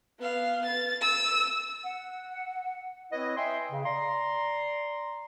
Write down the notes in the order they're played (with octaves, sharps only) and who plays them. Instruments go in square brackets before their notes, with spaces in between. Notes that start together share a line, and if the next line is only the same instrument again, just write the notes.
[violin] B3 F5
A6
E6 D#7
[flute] F#5
[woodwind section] C4 E4 B4 C#5 D#5
D#5 E5 G5 G#5 C6
C#3
D5 A#5 C6